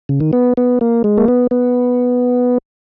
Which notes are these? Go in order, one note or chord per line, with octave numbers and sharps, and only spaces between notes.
C#3
D#3
B3
B3
A#3
G#3
A#3
B3
B3